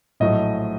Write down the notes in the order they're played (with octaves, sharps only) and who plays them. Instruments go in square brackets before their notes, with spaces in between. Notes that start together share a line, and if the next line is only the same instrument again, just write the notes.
[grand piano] A#1 A2 F#3 A3 D#5